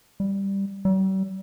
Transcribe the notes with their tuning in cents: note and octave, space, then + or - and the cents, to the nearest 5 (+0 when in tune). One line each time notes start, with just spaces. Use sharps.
G3 +5
G3 -45